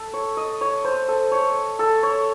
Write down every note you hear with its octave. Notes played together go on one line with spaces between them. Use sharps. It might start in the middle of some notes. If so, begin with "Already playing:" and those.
Already playing: A4
C#5
D#5
C#5
C5
A4
C#5
A4
C#5